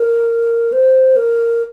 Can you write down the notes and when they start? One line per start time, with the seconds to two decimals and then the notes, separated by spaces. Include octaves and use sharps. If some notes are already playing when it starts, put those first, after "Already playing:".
Already playing: A#4
0.72 C5
1.16 A#4